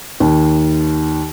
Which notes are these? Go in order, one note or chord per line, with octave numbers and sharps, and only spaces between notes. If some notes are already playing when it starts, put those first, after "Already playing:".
D#2